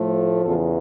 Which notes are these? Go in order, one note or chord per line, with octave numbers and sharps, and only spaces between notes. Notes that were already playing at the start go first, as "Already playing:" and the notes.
Already playing: A2 F3 A3
E2 C#3 E3 F4 A4